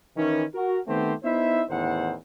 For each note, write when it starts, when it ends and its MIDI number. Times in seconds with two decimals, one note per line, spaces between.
0.17 0.43 51
0.17 0.43 52
0.17 0.43 61
0.54 0.78 66
0.54 0.78 70
0.88 1.13 51
0.88 1.13 57
0.88 1.13 59
0.88 1.13 60
0.88 1.13 67
0.88 1.13 72
1.24 1.63 59
1.24 1.63 63
1.24 1.63 64
1.24 1.63 72
1.24 1.63 76
1.70 2.15 33
1.70 2.15 40
1.70 2.15 51
1.70 2.15 72
1.70 2.15 78